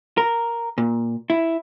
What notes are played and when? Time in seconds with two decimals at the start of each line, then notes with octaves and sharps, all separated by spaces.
0.18 A#4
0.78 A#2
1.30 E4